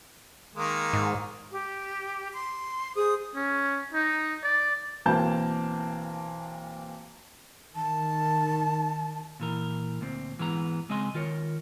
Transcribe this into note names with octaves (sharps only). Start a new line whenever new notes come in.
D#3 G#3 A#3
G#2
G4
C6
G#4 C5 D#6
C#4
D#4
D5
B1 E3 A#3 C4 A5 G6
D#3 A5
A#2 E3 A#4
D2 A#2 C4
G#2 E3 G#3 B3 C5 A#5
C#3 G#3 C4 D#5 G#5 C6
D#3 F4 A#4 C#5